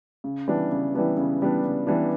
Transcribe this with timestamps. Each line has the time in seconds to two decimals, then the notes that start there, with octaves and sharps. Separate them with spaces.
0.24 C#3
0.48 E3 G3 B3 D4
0.72 C#3
0.94 E3 G3 B3 D4
1.17 C#3
1.41 E3 G3 B3 D4
1.64 C#3
1.87 E3 G3 B3 D4